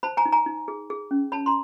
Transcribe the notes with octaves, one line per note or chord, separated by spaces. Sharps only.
C5 A5 B5
G#5 A#5
D#4
G#5 A#5
D#4
G#4
G#4
C#4
C#5 A5 B5
A#5 C6